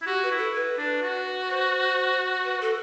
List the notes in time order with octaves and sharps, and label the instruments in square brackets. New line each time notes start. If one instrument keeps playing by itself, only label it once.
[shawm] E4
[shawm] F#4 [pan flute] G4
[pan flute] B4
[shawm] E4
[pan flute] A4
B4
[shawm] D4
F#4
[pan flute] C5
B4
A4